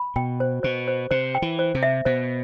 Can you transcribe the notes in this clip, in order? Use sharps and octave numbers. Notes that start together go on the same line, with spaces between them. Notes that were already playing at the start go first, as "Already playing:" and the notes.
Already playing: B5
B2 G5
C5
B2 C5
C5
C3 C5
G5
E3
C5
C3
E5
B2 C5